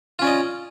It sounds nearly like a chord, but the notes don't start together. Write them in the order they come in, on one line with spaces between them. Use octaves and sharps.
F4 C#4 D5 D#5